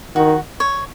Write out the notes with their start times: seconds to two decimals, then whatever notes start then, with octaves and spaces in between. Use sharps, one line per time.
0.15 D#3 F#4
0.60 C#5